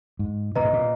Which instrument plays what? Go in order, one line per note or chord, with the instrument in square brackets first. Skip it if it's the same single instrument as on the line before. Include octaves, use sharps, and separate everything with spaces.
[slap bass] G#2
[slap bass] A#2 [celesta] B4 D#5 A#5
[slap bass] G#2
A#2